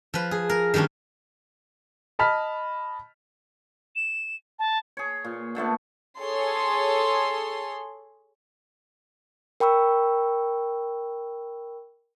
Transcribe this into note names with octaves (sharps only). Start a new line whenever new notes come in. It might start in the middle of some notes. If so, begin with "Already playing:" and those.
F3 B4
G#4
A#4
D#3 G3 A#3 C#4 D4
D#5 A5 B5 F6 B6
E7
A5
G#4 C#5
A#2
A#2 D3 A3 B3
G#4 A4 C#5 C6
A#4 G5 B5 C#6 E6